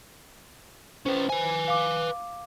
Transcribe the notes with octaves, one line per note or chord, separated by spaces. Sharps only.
C#4 B4 C5
B4 G#5
F5 D6